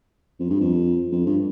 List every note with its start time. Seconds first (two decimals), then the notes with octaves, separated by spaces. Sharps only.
0.40 F2
0.50 G2
0.61 F2
1.12 F2
1.26 G2